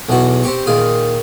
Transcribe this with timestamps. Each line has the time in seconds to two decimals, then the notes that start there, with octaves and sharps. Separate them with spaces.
0.09 B1 E2 E3 F#4 F#5
0.43 C4 G4 C#6
0.67 A#2 D#3 F4 G#4